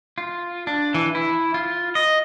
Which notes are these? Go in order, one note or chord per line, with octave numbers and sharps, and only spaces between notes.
F4
D4
E3
E4
F4
D#5